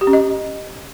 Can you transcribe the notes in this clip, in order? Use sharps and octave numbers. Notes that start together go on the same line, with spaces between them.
G4
C#4
D#5